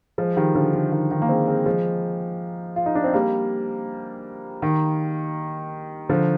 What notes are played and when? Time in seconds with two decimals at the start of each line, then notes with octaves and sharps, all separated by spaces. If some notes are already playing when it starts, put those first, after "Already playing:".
0.18 F3 G#3
0.36 D#3 G3
0.55 D3 F3
0.74 D3
0.92 D#3
1.11 D#3
1.22 A#3
1.28 G#3 C4
1.47 G#3 C4
1.66 F3 G#3
2.76 F4
2.86 D#4
2.95 D4
3.04 C4
3.13 G3 A#3
4.62 D#3
6.09 D3 F3